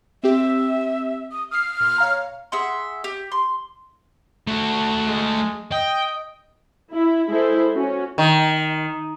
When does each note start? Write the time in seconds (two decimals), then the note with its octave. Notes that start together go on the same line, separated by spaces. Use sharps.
0.23 C4 G4 E5
1.32 D#6
1.51 D#6 F6 C7
1.80 A#2 C6
1.98 C#5 F5 A#5
2.52 G#4 E5 F#5 C6
3.04 G4
3.32 C6
4.47 A3 F#4
5.08 G#3
5.72 D#5 G5
6.91 E4
7.29 G#3 E4 A4 C5
7.75 C#4 F#4
8.18 D#3